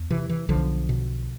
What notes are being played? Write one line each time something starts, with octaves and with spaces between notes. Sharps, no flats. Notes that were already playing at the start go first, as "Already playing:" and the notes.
Already playing: E2
C3 E3
E3
B1 D3 F3
B2